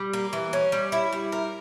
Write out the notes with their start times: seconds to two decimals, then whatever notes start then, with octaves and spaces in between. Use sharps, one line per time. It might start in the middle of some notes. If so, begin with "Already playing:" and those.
Already playing: G3
0.13 A#3
0.33 E3
0.53 C#4
0.72 G3
0.92 E4
1.13 G3
1.32 A#4